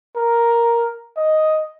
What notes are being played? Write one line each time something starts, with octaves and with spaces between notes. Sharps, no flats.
A#4
D#5